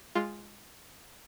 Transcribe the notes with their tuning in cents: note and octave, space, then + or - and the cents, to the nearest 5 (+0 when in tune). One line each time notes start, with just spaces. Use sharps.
G#3 -5 F4 +0